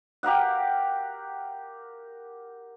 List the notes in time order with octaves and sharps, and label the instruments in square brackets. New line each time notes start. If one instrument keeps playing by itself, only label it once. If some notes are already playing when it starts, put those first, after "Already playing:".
[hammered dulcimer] G4 A#4 F5 F#5